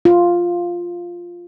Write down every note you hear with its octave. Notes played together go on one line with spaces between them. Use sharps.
F4